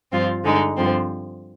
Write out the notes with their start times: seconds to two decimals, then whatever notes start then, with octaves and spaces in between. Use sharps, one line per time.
0.12 G2 F3 C4 F4
0.44 G2 D3 G#3 D#4
0.76 G2 D3 F3 C4